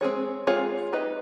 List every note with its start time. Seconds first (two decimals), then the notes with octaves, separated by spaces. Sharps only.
0.01 G#3 C4 F4 G#4 C#5
0.47 G#3 C4 F4 G#4 C#5
0.92 D#4 G4 B4 D#5